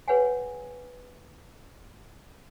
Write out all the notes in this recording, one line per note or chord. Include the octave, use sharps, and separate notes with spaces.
G#4 B4 C#5 F5 F#5 G#5